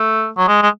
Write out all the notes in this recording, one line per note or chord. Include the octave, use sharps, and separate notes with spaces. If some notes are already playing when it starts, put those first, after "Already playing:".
Already playing: A3
F#3
G#3
G#3